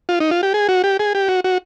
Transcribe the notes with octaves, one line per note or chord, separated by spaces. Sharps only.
F4
D#4
F4
G4
G#4
F#4
G4
G#4
G4
F#4
F#4